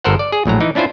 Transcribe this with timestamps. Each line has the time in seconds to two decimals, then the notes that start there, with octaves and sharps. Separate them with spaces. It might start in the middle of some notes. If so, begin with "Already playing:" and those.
0.04 G1 A4 A#4 C5 F#5
0.19 D5
0.32 G#4
0.46 A#1 A2 F#3 A#5
0.60 E3 D#4
0.75 C#4 D4 E4 F4 C5